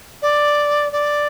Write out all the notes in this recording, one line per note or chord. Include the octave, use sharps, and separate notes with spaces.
D5
D5